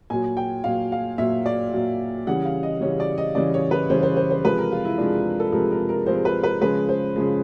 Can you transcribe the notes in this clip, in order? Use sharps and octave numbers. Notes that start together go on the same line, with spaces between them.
A#2 F#3 G#5
G5
A#2 F#3 F5
F5
A#2 F#3 E5
D5
A#2 F#3
C#3 E3 G3 F#5
F5
D#5
C#3 E3 G3 C#5
D5
D#5
C#3 E3 G3 D5
C#5
B4
C#3 E3 G3 C5
C5
C5
C5
C3 F3 G#3 B4
A#4
F4
E4
C3 F3 G#3 D4
A4
C3 F3 G#3 A#4
A#4
A#4
C3 F3 G#3 C5
B4
B4
C#3 F3 G#3 B4
C5
C#3 F3 G#3